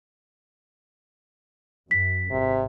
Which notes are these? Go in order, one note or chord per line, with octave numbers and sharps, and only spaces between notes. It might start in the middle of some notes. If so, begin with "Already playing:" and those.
F#2 B6
G#1 C3